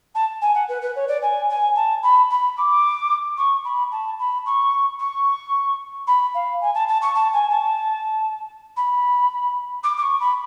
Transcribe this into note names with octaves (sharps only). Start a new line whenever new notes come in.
A5
G#5
F#5
B4
B4
C#5
D5
G#5
G#5
A5
B5
B5
D6
C#6
B5
A5
B5
C#6
C#6
B5
F5
G#5
A5
A5
C#6
A5
G#5
A5
B5
D6
D6
C#6
B5